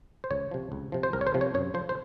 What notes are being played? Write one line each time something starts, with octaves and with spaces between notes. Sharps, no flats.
C5
C#2 C#5
C3 F3
C#2
C3 F3
C5
C2 A#4
C#5
C5
C3 F3
C#5
F#2 C#5
F3 C5
C5